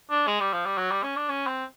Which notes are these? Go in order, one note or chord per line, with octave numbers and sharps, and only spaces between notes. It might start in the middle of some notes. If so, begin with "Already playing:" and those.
D4
G#3
G3
F3
G3
F#3
G3
C#4
D4
C#4
C4